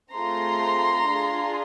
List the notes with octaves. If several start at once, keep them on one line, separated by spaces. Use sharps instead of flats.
A3 C4 F4 G#4 A#5 C6
D4 F4 G#4